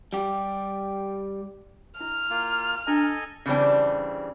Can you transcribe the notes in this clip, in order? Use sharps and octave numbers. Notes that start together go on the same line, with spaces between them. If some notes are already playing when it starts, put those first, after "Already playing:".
G3 G4
E4 F6
A#3 F4
D4 A4 D#5 G#5 A#5
C#3 E3 G3 C4 D4